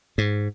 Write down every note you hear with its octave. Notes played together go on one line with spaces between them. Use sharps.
G#2